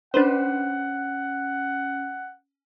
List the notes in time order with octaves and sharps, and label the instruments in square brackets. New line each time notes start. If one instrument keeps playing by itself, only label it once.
[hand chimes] C#4 [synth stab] D4 B4 C5 [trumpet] F#5